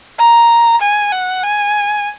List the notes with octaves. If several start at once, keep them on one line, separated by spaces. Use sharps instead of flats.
A#5
G#5
F#5
G#5